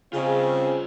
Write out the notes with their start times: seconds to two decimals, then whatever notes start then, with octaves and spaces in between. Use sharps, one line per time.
0.13 C#3 C4 F4 D#5